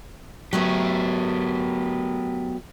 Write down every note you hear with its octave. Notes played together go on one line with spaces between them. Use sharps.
F#3 A3 B3 G4 A#4